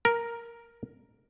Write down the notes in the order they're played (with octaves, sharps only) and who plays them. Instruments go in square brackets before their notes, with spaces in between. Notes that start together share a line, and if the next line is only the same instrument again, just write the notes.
[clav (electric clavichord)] A#4